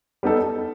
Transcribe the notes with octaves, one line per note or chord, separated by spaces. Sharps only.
G3 B3 D#4 A4